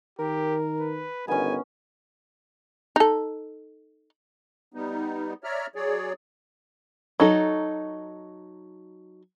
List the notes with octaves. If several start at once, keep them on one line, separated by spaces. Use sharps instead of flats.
D#3 G4 A#4
B4
G1 D#3 B3 C#4 G#5
D#4 A4
G3 B3 D#4
C#5 D5 E5 A#5 F6
F#3 G#4 C#5 D5
F#3 D#4 A4